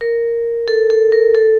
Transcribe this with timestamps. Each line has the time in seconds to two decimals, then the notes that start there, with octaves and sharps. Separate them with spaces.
0.01 A#4
0.68 A4
0.90 A4
1.12 A#4
1.35 A4